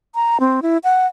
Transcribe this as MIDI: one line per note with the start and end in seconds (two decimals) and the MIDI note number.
0.15 0.38 82
0.40 0.60 60
0.62 0.78 64
0.84 1.07 78